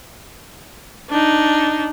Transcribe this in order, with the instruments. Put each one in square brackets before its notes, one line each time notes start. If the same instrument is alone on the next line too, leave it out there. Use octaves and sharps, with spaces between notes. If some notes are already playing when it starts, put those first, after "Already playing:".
[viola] D4 D#4